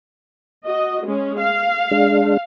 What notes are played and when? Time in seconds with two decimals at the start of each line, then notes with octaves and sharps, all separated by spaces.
0.66 F#4 D#5
1.06 G#3 C#4
1.40 F5
1.91 G#3 D4